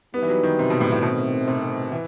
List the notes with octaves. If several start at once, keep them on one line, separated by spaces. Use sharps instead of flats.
G3 B3 D#4 G4 B4
E3
F#3
D#3
C3
B2
A2
A2
B2 D#3 A3 C4
C3
E3